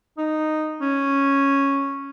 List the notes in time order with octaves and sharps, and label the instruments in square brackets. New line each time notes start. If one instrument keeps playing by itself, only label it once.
[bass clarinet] D#4
C#4